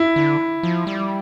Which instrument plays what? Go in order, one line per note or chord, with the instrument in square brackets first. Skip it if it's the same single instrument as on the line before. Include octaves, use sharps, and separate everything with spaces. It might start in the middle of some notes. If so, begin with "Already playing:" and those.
Already playing: [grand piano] E4
[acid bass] D3
F3
G3